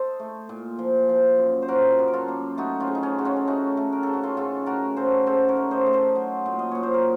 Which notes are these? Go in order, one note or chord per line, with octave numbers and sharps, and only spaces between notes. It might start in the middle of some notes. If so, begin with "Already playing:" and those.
Already playing: A4 C5 D#5
A3
A#2
F3
F3
F#2
C5
F3 F#4 A#4
F#2
A#4
F4 A4
A#3
A3 D#4 F#4
C#4 F4
C#3
D#4
C#4
C#3 F#4
C#4 F4
A4
A3 D#4 F#4
A3
A#4
C#3 A4
F#4
F4 A4
C#3 F4 A4
A3 F#4 A#4
C#3 A4 C5
C#3 A4 C5
A#4 C#5
A3
C5 D#5
A3
A4 C5
F#3
A#2
D#5
A#2 C#5
C5
A#4